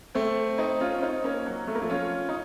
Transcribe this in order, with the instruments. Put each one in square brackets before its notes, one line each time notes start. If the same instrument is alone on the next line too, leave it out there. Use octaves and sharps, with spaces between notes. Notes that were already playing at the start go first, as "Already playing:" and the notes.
[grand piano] A3 C4
C4 D#4
C#4 F4
C#4
C4 D#4
A#3 C#4
F#3
A3
A#3
F3 A3
C#4 F4
D#4